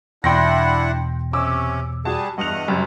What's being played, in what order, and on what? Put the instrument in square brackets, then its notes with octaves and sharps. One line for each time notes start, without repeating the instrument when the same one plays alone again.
[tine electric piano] E2 B2 [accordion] D4 E4 F#5 [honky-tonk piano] G5 C6 A#6
[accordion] C3 C#4 [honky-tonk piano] D6 E6
[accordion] G3 G#4 [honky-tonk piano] F#4 A5
[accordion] E2 D#5 F#5 [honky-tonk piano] G2 F7
[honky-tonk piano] F#1 F#2 G3